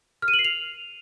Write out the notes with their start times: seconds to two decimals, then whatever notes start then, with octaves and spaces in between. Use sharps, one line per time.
0.22 F6
0.28 D#7
0.33 F#7
0.39 C7
0.45 F7